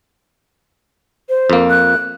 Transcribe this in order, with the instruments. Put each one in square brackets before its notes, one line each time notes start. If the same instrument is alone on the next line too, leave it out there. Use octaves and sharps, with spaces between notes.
[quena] C5
[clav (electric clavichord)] F2 A#3
[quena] F#6